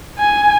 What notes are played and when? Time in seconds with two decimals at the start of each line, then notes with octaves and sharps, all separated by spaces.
0.19 G#5